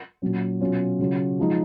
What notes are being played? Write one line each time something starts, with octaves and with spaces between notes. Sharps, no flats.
A#2 F#3 C#4
B2 F#3 C#4 F4
C#3 F#3 C#4 F4
F3 G#3 D#4